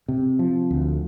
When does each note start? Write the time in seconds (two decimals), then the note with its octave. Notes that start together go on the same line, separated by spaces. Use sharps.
0.08 C3
0.39 F3
0.71 D2